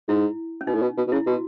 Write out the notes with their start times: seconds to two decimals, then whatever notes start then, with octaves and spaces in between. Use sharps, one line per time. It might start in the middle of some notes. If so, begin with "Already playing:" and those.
0.08 G#2 E4
0.61 C#4
0.67 B2 D#4
0.75 A2
0.82 B2
0.97 B2
1.08 B2
1.12 C#3 E4
1.27 B2 F#4